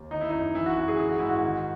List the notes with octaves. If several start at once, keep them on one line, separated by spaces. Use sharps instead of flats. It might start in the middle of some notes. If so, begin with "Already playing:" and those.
Already playing: D#2
D#3 D#4
E4
F#2 D#4
E3 E4
F#4
F#2 F#4
G#4
E3 G#4
F#4
G#2 E4
F#4
D#3